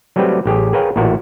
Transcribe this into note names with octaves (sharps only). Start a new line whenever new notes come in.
F#3 G3 A3 C4 G4 B4
A1 G4 G#4
G#4 A#4 B4 C#5 F5 G5
A1 A#2 E4 F#4 A#4